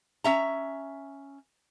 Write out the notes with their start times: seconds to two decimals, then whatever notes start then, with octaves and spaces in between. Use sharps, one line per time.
0.24 C#4 E5 A#5